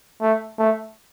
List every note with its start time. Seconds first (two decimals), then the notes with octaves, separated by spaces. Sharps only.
0.22 A3
0.58 A3